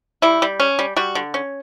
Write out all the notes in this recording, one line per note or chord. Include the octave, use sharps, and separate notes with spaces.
G3 E4
G3
C#4
G3
G3 F#4
D3
C#4